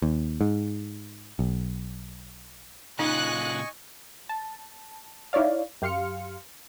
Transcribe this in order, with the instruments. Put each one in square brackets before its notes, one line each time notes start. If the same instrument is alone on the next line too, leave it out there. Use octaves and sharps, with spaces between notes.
[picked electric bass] D#2
G#2
B1
[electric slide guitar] A#2 C#3 F4 [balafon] D#4 [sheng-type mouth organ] D#5 G#5 C#6 [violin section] F#6
[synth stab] A5
D#4 E4 C#5 D5 F5
F#2 G4 F5 C6 F6 C#7